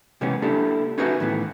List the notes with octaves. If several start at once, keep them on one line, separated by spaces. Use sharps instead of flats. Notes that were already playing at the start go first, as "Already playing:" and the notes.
C3 E3 G#3 B3 C#4
A#3 D4 E4 G4 A4
C#4 D#4 F#4 G#4 B4 E5
A2 D#3 E3 B3